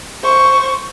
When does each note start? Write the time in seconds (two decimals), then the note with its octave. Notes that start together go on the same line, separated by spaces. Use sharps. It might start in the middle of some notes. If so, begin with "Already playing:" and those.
0.23 C5 C#6